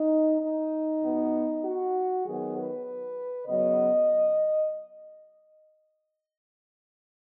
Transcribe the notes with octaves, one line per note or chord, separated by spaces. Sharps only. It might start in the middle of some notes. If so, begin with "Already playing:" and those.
Already playing: D#4
D#4
B2 B3
F#4
D#3 F#3 B3 G#4
B4
C#3 F#3 B3 D#5